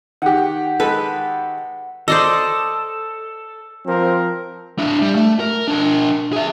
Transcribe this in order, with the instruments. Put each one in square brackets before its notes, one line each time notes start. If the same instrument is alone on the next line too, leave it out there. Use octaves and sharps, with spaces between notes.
[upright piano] D#3 G4 [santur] F#5
[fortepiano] G#3 A4 [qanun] B4
[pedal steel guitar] A4 [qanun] C5 D5 D#5 [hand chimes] E6
[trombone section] F3 C4 A#4
[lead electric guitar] D4 E4
G3
A3
A#4
D4 A#4
G#4 E5